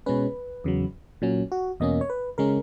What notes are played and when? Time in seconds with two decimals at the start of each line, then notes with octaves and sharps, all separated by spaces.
0.06 B2 G#3 C#4 B4
0.64 E2 C#3 F#3
1.22 A#2 F#3 C#4
1.52 F#4
1.80 E2 B2 A#3 C#4 D#5
2.01 C#5
2.10 B4
2.38 C#3 G#3 C#4 A#4